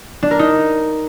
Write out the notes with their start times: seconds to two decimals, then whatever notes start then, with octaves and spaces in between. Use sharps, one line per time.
0.23 D4
0.31 A#4
0.39 D#4